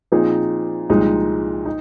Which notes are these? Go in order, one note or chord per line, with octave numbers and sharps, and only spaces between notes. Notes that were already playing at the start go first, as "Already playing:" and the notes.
A#2 F3 C4 D#4 G#4
C2 A#2 F3 G#3 D#4
D#4